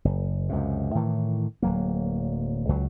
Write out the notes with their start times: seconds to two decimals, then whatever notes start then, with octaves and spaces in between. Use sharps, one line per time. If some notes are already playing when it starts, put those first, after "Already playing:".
0.05 F#1
0.49 C#2 F#2 C3
0.95 A2 D#3 E3
1.62 D1 F#3 A#3
2.69 C#2 F#3